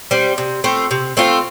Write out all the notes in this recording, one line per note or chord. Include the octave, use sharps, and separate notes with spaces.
G3 C4
C3
A3 C4 F4
C3
A3 C4 F4